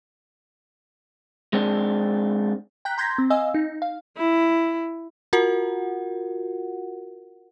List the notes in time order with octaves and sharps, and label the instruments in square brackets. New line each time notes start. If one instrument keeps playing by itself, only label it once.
[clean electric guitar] G#3 C4 D4
[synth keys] G5 A#5 F#6 G6 B6
A#5 C6 G6 G#6 A#6 B6
C4
D#5 F5 G#5 E6
D#4
F5
[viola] E4
[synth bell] F4 F#4 A#4 F#5